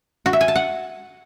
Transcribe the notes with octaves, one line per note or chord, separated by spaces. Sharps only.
F#4
E5
G#5
A5
F#5